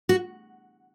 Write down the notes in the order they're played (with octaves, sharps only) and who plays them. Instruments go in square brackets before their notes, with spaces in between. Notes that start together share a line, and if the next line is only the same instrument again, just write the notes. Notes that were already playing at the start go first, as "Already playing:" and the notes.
[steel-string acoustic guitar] F#4